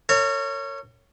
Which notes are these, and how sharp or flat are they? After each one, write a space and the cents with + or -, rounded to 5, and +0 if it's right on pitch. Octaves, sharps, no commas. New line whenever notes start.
A#4 -40 C#5 +0